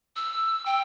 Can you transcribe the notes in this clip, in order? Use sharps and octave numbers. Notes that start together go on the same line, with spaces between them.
E6
G5